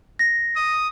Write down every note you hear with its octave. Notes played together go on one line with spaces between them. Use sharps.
A#6
D#6